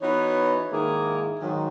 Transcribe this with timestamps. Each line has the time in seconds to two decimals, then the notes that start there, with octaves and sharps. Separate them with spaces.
0.01 E3 B3 D#4 F#4 C#5
0.70 G#2 D#3 A#3 E4 G#4
1.40 G#2 D#3 F#3